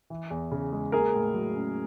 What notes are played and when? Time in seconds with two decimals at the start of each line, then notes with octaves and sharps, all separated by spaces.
0.10 E3
0.30 E2
0.51 C#3
0.73 G#3
0.92 A#3 G#4 A#4
1.14 A2
1.34 F#3
1.56 C#4